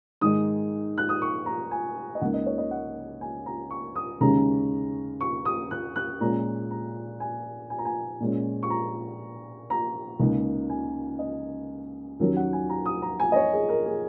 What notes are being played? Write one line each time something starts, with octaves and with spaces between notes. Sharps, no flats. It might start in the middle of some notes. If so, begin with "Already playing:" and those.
G#2 D#3 G#3 D#4 D#6
F#6
D#6
C#6
A#5
G#5
D#5
C#2 C#3 A#3 D#4 F#5
D#5
C#5
D#5
F#5
G#5
A#5
C#6
D#6
D#2 C#3 G#3 C#4 A#5
C#6
D#6
F#6
F#6
A#2 G#3 C#4 A#5
A#5
G#5
G#5
A#5
G#5
A#2 G#3 C#4
C#6
A#5
A#5
C#2 C#3 A#3 D#4
G#5
D#5
D#2 D#3 F#3 C#4 A#4
F#5
G#5
A#5
D#6
A#5
G#5
D#5
C#5
G#4
A#4
G#4